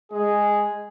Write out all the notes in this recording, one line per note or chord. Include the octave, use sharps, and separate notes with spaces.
G#3 G#4